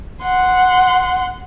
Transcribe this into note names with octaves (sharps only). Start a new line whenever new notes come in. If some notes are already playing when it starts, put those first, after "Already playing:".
F#5 C6